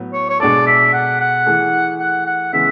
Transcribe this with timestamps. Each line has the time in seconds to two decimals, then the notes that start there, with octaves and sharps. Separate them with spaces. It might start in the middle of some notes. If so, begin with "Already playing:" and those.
Already playing: A2 F#3 B3
0.13 C#5
0.29 C#5
0.40 B2 G#3 D4 A4 D5
0.67 E5
0.93 F#5
1.20 F#5
1.46 E3 A3 E4 G#4
1.99 F#5
2.27 F#5
2.53 C#3 E3 G#3 B3 E5